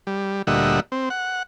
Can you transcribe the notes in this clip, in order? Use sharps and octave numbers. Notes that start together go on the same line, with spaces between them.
G3
D2 A#2 G3 D#5 E5 F#5
C4
F#5